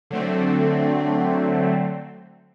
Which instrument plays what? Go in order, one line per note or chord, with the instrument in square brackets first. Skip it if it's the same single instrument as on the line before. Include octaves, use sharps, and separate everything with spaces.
[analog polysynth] D3 F#3 A3 C4